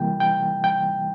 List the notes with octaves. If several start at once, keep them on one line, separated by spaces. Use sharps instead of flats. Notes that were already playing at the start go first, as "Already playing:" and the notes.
Already playing: C3 E3 G3 A#3 G5
G5
G5